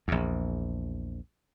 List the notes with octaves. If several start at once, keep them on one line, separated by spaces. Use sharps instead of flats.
A#1 E2